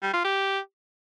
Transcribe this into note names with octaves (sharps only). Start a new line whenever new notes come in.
G3
F4
G4